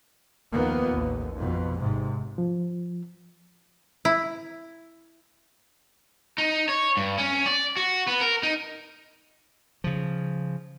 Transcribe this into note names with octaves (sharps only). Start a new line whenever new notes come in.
D#2 D#3 F3 A#3 B3
A1 D#2
F2 B2
G#1 G#2 C3
F3
E4
D#4
C#5
G2
C#4
D5
F#4
B3
A#4
D#4
C#3 F3